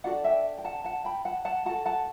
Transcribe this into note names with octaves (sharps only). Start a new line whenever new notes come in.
D4 F#4 A4 D5 F#5
E5 G5
G5
F#5 A5
F#5 A5
G5 B5
F#5 A5
F#5 A5
F#4 A4 F#5 A5
F#5 A5